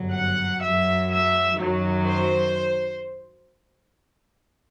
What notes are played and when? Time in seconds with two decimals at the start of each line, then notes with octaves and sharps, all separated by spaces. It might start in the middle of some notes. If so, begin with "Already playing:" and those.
Already playing: G1 F#2 F#3
0.13 F#5
0.62 F#2 F#3 E5
1.11 E5
1.59 F#2 D#3 F#3
2.07 C5